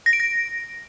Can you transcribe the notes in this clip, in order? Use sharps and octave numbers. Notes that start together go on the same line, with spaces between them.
A#6
D7
A#6